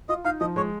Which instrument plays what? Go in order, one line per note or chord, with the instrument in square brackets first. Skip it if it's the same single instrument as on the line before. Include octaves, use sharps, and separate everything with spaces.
[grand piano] F4 [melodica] D#5
[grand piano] D#4 [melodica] F5
[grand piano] F3 [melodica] D#5
[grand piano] G#3 [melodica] C#5